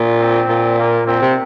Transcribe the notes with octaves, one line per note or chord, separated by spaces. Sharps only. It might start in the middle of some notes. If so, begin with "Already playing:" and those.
Already playing: A#2
C4
A#2
A#3
A#2 C4
C3